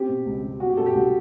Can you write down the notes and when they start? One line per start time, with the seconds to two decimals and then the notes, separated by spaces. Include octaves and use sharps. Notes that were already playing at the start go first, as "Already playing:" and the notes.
Already playing: C4 G4
0.08 B2
0.25 C#2
0.43 G3
0.60 B3 F#4
0.69 G4
0.77 B2 A4
0.86 G4
0.94 C2 F#4